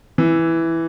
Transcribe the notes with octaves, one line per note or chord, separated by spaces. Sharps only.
E3